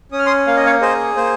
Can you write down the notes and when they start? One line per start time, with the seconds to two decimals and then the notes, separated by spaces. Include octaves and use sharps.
0.12 C#4 D#6
0.19 F6
0.26 C6 D#6
0.47 A#3 F5
0.57 D#5
0.66 C#5 F5
0.81 G#4 C5 D#5
1.17 A#3 C5